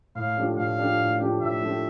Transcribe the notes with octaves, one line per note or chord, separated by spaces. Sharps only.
A2 F5
F3 A3 D4 G4
A2 F5
F3 A3 D4 G4
A2
F3 A3 D4 G4
A2 E5
F3 A3 D4 G4